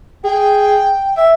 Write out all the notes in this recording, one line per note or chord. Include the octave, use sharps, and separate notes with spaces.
G#4 G5
E5